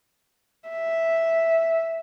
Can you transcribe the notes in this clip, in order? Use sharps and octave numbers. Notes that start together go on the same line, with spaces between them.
E5